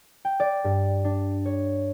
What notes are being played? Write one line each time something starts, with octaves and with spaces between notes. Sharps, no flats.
G5
D5
G2
D4
C#5